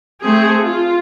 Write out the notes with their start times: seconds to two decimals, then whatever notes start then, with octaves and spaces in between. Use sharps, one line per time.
0.21 A3 C4 G#4
0.63 F4